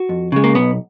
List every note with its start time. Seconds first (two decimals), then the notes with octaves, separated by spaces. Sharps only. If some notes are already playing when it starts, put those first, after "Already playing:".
Already playing: F#4
0.09 F2
0.32 C#3 G#3
0.44 A#3
0.55 B1 B3